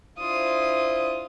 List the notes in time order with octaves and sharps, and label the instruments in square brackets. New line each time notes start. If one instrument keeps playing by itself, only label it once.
[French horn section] D4 E4 C5 [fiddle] F4 D#6